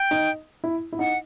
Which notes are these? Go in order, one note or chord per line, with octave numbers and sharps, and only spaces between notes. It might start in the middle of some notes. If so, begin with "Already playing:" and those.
Already playing: G5
D#4
E4
E4
D#4 F#5